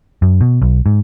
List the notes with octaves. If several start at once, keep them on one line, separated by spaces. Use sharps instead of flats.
F#2
B2
B1
G#2